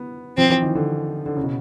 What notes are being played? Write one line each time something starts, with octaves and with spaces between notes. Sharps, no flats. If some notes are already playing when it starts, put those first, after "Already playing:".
Already playing: B3
F3 C4
E3
D#3
D3
D3
C#3
B2